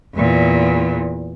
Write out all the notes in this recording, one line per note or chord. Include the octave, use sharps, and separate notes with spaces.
E2 A#2